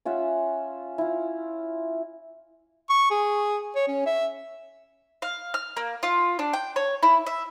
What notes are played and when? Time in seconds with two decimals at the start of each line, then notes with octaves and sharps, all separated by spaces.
0.05 C#4 F4 E5 F#5
0.98 E4 F4
2.89 C#6
3.11 G#4
3.75 C#5
3.87 C#4
4.06 E5
5.22 F5
5.54 F6
5.77 A#3
6.03 F4
6.39 D4
6.53 G5
6.76 C#5
7.03 E4
7.27 E5